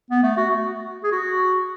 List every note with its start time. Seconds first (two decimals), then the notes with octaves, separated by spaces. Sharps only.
0.11 B3
0.23 A3
0.37 F#4
1.04 G#4
1.12 F#4